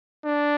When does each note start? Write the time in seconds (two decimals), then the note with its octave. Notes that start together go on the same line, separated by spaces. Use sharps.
0.25 D4